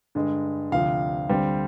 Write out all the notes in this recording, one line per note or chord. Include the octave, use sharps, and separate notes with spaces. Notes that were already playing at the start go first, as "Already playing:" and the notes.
G2 D3 G#3
D2 C3 F3 F5
D2 D3 G3 C4